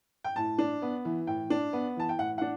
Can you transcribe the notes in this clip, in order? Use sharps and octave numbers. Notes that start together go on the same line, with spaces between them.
G5
A2 A5
D4
B3
E3
A2 G5
D4
B3
E3 A5
G5
A2 F#5
D4 F#5